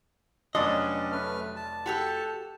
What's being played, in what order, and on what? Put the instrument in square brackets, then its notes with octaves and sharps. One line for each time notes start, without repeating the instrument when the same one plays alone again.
[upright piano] F1 D5 C6 [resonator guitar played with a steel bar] F#3 [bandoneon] C#4 D4 [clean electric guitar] D#5
[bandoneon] A3 B4 F6
A5
[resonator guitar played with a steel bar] F#4 G4 A4